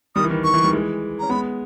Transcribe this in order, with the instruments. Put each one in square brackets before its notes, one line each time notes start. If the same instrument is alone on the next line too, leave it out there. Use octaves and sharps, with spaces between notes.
[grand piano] D#3 G3 [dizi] D#6
[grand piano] E3
D#3
[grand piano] D#3 [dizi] C#6
[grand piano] E3
D#3 G3
E3 G#3
[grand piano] C#4 [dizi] A#5
[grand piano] G#3 B3 [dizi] B5